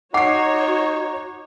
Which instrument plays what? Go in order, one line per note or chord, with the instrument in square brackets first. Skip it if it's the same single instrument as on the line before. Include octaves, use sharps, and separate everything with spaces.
[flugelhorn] D#4 [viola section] F#4 C#5 [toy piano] F#5 [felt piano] D6 C7